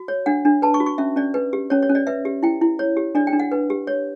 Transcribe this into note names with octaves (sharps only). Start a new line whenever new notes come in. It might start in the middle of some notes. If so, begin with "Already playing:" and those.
Already playing: F#4
C#5
D4 F#5
D4
B4 A5
C#6
F#4
C#6
C#4 E5
C#4 D5
B4
G4
C#4 C#5
C#5
C#4
D5
B4 E5
G4
E4 G5
E4
C#5
G4
D4 D5
G5
D4
F#5
B4
G4
C#5